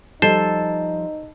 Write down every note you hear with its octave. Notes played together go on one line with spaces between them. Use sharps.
F3 G3 D#4 A4 C5 D#5